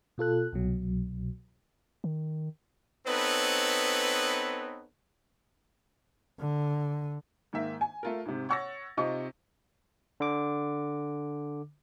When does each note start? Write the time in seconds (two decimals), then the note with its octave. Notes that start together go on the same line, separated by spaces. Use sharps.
0.18 B2 F4 A4 F#6
0.53 C2 B2 F#3
2.04 D#3
3.07 B3 C4 D#4 A4 B4 C#5
6.40 D3
7.53 G#2 D#3 A#3 E5
7.81 G#5
8.03 A3 F4 A#4
8.26 G#2 C3
8.49 C#5 F#5 C#6 E6 A6 A#6
8.97 C3 C4 D#4 F4 D#5 C#6
10.20 D3 D6